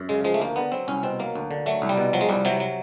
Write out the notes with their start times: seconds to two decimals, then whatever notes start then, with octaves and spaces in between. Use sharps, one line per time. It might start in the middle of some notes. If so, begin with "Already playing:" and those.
Already playing: F#2
0.09 C#3 G#3
0.24 F3 G#3
0.34 A3
0.40 D2 A#3
0.56 D3 B3
0.72 F#3 C4
0.88 C2 C#4
1.03 B2 C4
1.19 F#3 A#3
1.36 D2
1.51 D3
1.66 F#3 A3
1.82 C2
1.89 G3
1.98 B2
2.13 F3 F#3
2.21 G#3
2.29 C2 G3
2.45 C3 F#3
2.60 F#3